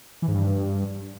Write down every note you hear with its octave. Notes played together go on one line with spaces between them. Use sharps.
E3
G#2
G2